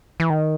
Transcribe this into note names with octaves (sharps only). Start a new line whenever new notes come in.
E3
D#3